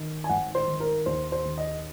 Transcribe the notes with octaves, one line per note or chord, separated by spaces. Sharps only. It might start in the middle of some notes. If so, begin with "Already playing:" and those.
Already playing: D#3
G#5
G#1 F#5
C5
D#3
A#4
D#2 C5
C5
D#2
D#5